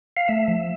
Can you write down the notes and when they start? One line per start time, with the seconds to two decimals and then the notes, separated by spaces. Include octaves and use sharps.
0.17 F5
0.28 A3 E5
0.48 F3